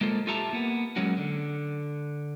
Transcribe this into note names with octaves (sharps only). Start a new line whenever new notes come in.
G#3 A#3 F4 A4 C5
F4 G4 A4 E5 A5 A#5
A#3 B3
F#3 G#3 A#3 C#4 F#4
D3